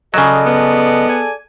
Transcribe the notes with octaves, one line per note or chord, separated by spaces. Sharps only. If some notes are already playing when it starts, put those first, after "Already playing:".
C#3 F#3 G#4 A4 D5 D#5
B3
G#5